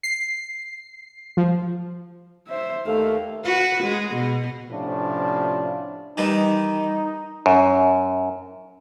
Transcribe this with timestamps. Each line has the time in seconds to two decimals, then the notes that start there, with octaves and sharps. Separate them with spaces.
0.03 C7
1.37 F3
2.47 C5 E5
2.86 D#2 A3 A4 F5
3.44 F#4 B4
3.84 G#3
4.15 B2
4.70 A2 C3 F3 C#4 D4 F4
6.17 D#3 E3 G3 D#4
7.46 F#2